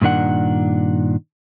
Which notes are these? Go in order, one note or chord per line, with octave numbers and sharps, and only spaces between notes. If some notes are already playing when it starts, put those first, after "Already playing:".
G2 A#2 D#3 D4 F#5